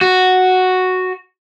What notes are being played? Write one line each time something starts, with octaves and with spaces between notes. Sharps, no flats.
F#4